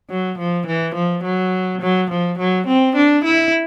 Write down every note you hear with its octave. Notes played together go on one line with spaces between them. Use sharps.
F#3
F3
E3
F3
F#3
F#3
F3
F#3
C4
D4
E4